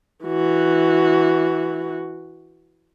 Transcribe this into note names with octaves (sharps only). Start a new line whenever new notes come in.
E3 F#4